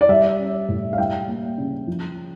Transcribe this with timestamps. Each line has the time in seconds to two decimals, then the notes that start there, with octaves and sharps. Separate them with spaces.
0.01 D5
0.09 G3 E5
0.38 C#4
0.69 A2
0.93 F5
0.98 G3 G5
1.28 A#3
1.58 C#3
1.87 F3